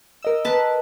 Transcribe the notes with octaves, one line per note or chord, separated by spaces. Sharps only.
A#4 D#5 E6
B4 A5